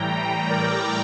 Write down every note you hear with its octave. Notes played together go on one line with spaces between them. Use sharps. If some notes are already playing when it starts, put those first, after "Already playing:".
Already playing: A2 E3 G3 G5 A#5
G5 A#5
A#4 D5